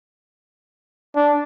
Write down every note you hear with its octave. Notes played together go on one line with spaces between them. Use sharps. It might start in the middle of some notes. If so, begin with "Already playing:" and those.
D4